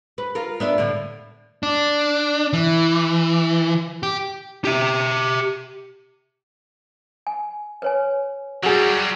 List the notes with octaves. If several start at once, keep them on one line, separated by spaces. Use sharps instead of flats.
B4
F4 A#4
B3 D4 E5
A2 D3
D4
E3
G4
G4 E5
G#5
B4 C#5 G#5
F#3 G3 F#4 G#4